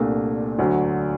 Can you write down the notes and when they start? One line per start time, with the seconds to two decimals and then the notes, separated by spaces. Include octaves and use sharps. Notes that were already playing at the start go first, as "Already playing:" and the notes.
Already playing: C2 A#2 A3 D4
0.58 D2 D3 F#3